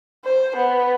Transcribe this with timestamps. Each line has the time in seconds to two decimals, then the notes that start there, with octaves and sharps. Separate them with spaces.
0.25 C5
0.56 B3